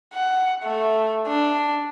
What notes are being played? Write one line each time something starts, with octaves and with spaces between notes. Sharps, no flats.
F#5
A3
D4